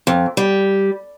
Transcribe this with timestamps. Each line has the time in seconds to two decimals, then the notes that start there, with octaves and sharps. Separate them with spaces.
0.07 F2
0.37 G3